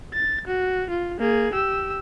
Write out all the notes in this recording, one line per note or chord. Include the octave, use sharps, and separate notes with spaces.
A6
F#4
F4
A#3 G#4
G4 E6